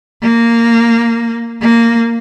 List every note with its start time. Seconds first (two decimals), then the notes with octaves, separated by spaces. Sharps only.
0.23 A#3
1.62 A#3